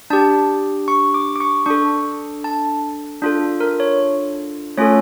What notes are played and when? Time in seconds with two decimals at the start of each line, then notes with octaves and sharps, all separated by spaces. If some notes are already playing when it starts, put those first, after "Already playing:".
0.10 D4 G4 A5
0.88 C#6
1.14 D6
1.36 D6
1.40 C#6
1.66 D4 A4 C#6
2.44 A5
3.22 D4 F4 A4
3.60 A#4
3.80 C#5
4.77 A3 C#4 F4 A4 C#5